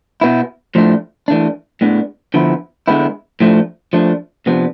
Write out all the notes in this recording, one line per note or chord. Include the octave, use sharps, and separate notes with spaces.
B2 B3 E4
A2 F3 A3 D4
E3 A3 D4
A2 G#3 B3 D4
D3 F3 B3 E4
D3 G#3 B3 E4
A2 F3 A3 D4
F3 A3 D4
C3 F3 B3 D4